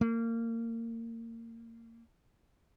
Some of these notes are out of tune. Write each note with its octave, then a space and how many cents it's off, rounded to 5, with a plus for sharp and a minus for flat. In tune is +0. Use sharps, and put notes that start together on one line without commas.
A#3 -25